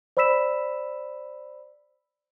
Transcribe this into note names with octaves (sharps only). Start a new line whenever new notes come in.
C5 D5 B5 E6 B6 E7